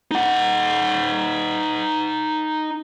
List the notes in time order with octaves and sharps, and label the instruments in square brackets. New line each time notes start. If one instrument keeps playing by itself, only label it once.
[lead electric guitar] D#4 F#5